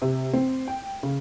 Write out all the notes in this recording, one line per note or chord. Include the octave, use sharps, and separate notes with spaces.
C3
C4
G5
C#3